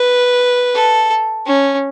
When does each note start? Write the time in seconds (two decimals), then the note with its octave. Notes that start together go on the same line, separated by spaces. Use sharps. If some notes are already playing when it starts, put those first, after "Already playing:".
Already playing: B4
0.75 A4
1.46 C#4